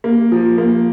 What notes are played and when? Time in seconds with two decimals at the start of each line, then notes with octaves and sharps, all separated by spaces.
0.04 A#3
0.32 F3
0.58 A#3